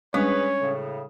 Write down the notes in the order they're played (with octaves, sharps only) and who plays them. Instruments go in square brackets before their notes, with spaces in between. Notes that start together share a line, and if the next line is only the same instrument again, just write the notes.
[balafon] G3 G#3 D4 [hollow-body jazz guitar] C#4 [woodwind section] G#4 B4 [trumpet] C#5
[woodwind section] A2 C#3